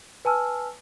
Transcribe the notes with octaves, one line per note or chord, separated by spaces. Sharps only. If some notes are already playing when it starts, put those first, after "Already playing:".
B4 G#5 A5 E6 F6